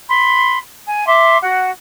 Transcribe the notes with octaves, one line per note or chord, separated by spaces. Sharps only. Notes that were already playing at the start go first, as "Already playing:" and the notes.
B5 C6
G#5
E5 C6 D6
F#4 F#5